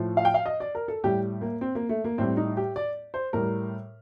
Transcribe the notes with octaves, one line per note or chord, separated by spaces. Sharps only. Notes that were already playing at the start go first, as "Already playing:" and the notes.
Already playing: A2 F3
F5
G5
F5
D#5
D5
A#4
A4
A2 G3 G4
A#3
C4
A#3
A3
A#3
A2 G3 C4
D#4
G4
D5
C5
A2 G3 A#4